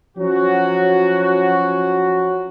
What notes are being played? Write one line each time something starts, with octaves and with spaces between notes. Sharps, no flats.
F3 F#3 C#4 F#4